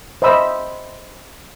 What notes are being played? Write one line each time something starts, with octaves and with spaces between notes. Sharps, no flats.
C5 D#5 E5 B5 E6